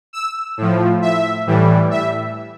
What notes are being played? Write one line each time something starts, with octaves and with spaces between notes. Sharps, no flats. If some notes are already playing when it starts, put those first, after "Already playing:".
E6
A2 F3
E5
A2 E3 G3
E5